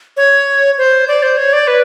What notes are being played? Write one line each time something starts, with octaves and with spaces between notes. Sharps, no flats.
C#5
C5
D5
C5
C#5
D5
B4